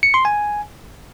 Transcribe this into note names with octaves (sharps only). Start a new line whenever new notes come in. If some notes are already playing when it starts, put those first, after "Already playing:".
C#7
C6
G#5